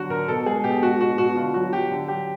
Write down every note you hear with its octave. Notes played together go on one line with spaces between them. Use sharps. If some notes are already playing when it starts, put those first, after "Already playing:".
Already playing: D3 F#3 F#4
D3 A#4
B2 A4
G#3 G#4
B2 G4
G#3 F#4
B2 F#4
B2 F#4
D3 F4
F#3 F#4
F#3 G4
D3
F#3 G4